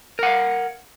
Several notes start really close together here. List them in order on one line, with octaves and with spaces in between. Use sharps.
A#4 F#5 F5